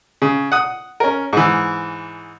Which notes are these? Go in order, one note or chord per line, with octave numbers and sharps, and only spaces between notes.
C#3
F#5 D#6
C#4 A#4
G#2 E3